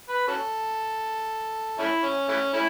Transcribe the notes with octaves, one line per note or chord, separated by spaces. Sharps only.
B4
C#4 F#4 A4
A3 C#4 E4
C#4
E3 A3 C#4
A3 C#4 E4